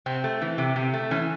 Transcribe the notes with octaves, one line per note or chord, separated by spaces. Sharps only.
C3 C4
A3
E3
C3
C3
A3
E3 C#4